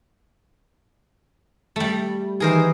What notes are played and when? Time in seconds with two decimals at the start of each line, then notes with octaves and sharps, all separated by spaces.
1.76 G3 A3
2.40 D#3 E3 G#4 A#4 C5